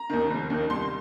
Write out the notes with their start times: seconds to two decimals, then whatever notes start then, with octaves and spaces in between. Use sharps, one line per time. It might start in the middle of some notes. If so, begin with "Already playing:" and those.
Already playing: A#5
0.10 D#2 D#3
0.30 F1
0.50 D#2 D#3
0.70 C2 C6